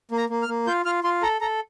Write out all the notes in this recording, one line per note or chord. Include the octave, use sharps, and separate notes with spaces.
A#3
A#5
A#3
F6
A#3
F4 G6
F4 F6
F4 C6
A4 A#5
A4 A#5